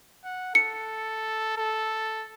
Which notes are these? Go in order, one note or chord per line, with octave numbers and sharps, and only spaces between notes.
F#5
A4 C#7
A4